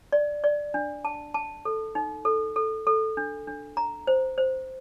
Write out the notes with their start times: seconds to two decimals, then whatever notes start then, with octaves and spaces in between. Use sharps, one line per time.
0.12 D5
0.44 D5
0.74 D4
1.05 A5
1.34 A5
1.65 A4
1.95 D#4
2.25 A4
2.56 A4
2.87 A4
3.17 D4
3.48 D4
3.77 A#5
4.07 C5
4.38 C5